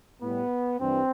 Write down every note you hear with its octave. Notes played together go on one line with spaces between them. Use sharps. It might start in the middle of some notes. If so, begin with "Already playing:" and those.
A2 G3 B3
G2 E3 G3 C4